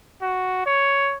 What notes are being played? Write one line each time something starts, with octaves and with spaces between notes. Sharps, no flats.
F#4
C#5